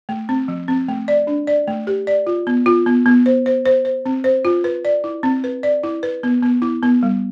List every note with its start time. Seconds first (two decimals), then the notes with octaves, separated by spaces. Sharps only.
0.09 A3
0.29 C4
0.48 F3
0.68 C4
0.88 A3
1.08 D5
1.27 D4
1.47 D5
1.68 A3
1.87 G4
2.07 D5
2.27 F4
2.47 B3
2.66 F4
2.86 B3
3.06 B3
3.26 C5
3.46 C5
3.66 C5
3.85 C5
4.06 C4
4.24 C5
4.45 F4
4.64 B4
4.85 D5
5.04 E4
5.23 C4
5.44 B4
5.63 D5
5.83 E4
6.03 B4
6.23 B3
6.43 B3
6.62 E4
6.83 B3
7.03 G3